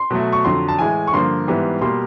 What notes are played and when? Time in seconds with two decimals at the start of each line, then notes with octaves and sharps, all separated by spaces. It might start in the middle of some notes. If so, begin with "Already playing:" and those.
Already playing: C6
0.10 B2 F#3 A3
0.32 C#6
0.45 F2 D3 F#3 C6
0.69 A5
0.79 A2 E3 G#3 G#5
1.07 C#6
1.13 G2 D3 F3 A#3 C6
1.48 G#2 E3 G3 B3
1.81 B2 G3 A#3 C6